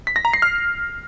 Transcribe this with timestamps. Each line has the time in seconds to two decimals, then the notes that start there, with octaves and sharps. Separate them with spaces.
0.07 B6
0.16 A#6
0.25 A#5
0.33 C7
0.42 F6